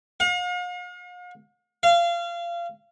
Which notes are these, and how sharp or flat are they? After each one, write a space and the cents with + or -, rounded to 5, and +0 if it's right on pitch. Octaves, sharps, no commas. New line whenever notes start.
F5 +45
F5 -25